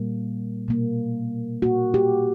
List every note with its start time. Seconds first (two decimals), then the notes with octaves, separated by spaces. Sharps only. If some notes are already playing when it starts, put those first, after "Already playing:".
Already playing: A#2 G3 A#3
0.68 B2 A#3
1.62 A#2 A#3 F#4
1.94 G4